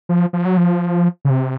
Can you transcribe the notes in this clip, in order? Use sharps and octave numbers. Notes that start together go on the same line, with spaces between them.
F3
F3
F#3
F3
C#3
C3